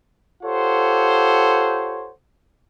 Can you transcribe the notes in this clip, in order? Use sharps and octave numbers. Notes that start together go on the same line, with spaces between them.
F4 G4 A4 C5 C#5 F#5